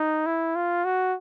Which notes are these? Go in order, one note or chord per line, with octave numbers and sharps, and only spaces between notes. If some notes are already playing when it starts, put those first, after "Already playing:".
Already playing: D#4
E4
F4
F#4